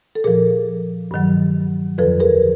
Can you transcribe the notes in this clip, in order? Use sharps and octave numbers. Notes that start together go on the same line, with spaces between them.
A4
A#2 F3 G#4 A#4
G2 D#3 F#3
F2 D3 F3 A4 B4
G#4 A#4